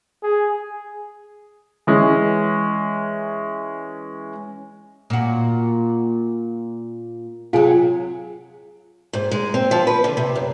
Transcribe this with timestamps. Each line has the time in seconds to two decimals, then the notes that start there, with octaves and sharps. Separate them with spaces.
0.23 G#4
1.87 E3 G#3 C#4
5.10 A#2 F#4
7.53 C3 F#3 F4 G#4
9.13 G#2
9.31 G#3
9.54 C4
9.71 F3
9.87 B4
10.04 D3
10.17 C3
10.36 F#2